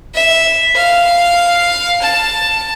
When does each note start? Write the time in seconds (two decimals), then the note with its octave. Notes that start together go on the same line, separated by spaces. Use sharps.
0.15 E5
0.75 F5
2.02 A5